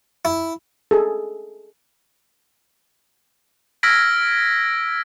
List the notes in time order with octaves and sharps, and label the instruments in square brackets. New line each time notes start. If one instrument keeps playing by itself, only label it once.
[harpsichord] E4
[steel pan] G#4 A4
[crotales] E6 F6 G#6 A#6 B6 D7